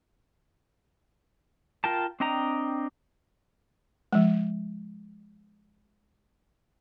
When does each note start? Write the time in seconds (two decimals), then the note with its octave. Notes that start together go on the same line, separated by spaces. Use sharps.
1.84 F4 A#4 G5 A5
2.20 C4 D4 D#5 G5 A#5
4.13 F3 G#3